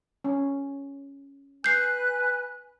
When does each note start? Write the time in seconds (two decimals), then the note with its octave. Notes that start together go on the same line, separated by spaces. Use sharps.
0.24 C#4
1.64 B4 G#5 F#6 G6 C7